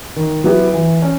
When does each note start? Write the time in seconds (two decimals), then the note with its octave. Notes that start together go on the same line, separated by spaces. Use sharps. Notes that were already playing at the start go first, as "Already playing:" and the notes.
0.16 D#3
0.44 F#3 B3 E4 G4
0.74 E3
1.02 C#4